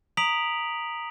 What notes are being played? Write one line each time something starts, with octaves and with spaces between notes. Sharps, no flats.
A#5 D#6 B6 D7 F7 F#7